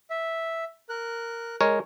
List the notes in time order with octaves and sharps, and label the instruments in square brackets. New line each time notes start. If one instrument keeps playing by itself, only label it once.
[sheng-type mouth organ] E5
A#4 F#6
[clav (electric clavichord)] G#3 A#4 C#5